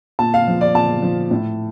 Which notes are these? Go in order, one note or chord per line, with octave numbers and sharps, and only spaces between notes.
A#2 A5
F5
F3
D5
A#2 A5
F3
A2